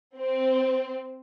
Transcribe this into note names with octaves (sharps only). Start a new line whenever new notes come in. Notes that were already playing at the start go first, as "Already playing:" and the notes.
C4